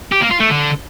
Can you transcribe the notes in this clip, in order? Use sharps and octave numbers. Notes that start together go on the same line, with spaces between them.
G4
A#3
F4
A3
D3